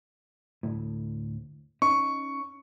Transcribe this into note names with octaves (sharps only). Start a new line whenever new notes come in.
D2 A2
C#4 D#4 C#6